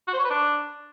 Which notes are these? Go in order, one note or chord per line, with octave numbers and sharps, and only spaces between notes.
F#4
C5
C#5
B4
D4